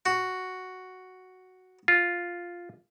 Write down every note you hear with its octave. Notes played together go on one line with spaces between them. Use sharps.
F#4
F4